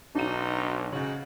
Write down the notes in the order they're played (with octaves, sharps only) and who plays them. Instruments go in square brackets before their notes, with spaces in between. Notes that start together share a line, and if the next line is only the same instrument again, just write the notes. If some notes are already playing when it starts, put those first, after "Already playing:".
[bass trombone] B1 [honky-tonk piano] D4 F#4 D#7 [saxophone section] D#4
[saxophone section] G#2 F#4 [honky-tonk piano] C#3